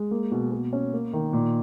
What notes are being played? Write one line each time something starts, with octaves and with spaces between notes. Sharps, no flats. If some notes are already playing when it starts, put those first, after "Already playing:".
Already playing: G#3
A#3
B2
B2
C#4
A#3
D#3
A#2